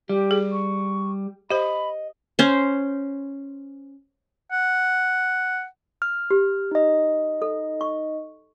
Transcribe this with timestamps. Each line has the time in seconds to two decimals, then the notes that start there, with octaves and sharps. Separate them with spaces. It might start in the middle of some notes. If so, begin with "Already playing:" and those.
0.09 G3 G4
0.31 G#4
0.52 C#6
1.51 G4 C5 D#5 B5
2.39 C#4 C5
4.52 F#5
6.02 F6
6.31 G4
6.71 D#4 D#5
7.42 A4
7.81 C#6